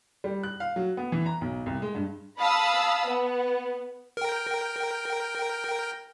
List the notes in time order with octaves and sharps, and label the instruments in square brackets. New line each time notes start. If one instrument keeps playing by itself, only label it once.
[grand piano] G3
F#6
F5
F#3
B3
E3
A#5
B1
C2
G#3
G2
[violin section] F5 A5 B5 D#6 E6
B3
[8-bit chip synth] A#4 G5